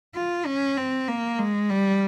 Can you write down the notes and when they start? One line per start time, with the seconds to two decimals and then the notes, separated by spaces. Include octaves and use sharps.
0.15 F4
0.46 C#4
0.77 C4
1.08 A#3
1.39 G#3
1.70 G3